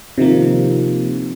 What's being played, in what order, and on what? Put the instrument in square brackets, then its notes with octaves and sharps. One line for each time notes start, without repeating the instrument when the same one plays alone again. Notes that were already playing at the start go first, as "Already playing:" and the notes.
[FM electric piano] C3 D#3 F3 A#3